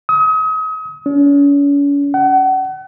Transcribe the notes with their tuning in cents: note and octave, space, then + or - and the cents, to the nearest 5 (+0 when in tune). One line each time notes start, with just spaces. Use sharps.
D#6 +35
C#4 +40
F#5 +35